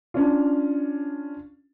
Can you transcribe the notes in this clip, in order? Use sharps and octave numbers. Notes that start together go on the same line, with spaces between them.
C#4 D4 F4